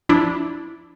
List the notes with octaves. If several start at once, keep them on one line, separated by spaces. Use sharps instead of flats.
F3 D4 E4